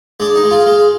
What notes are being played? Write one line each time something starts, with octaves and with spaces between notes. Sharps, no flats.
G#3 D4
D#4
G#3
F4
G#3